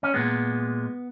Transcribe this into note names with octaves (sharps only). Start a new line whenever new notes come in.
C#4
A#2 G#3 B3